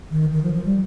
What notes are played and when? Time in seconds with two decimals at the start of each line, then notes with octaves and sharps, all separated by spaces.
0.11 D#3
0.32 D#3
0.43 F3
0.53 F3
0.65 G3